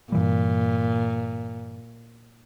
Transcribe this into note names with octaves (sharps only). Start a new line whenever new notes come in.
G2 A#2 E3 G3